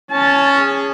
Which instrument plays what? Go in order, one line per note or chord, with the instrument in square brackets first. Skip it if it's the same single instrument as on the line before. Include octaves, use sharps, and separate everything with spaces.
[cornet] C#4 [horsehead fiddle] A5
[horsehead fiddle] G#4